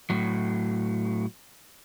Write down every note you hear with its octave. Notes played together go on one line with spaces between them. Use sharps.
A2 F#3